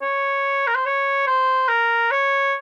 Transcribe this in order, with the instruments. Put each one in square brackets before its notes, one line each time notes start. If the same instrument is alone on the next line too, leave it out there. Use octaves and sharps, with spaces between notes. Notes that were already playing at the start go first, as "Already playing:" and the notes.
[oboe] C#5
A#4
C5
C#5
C5
A#4
C#5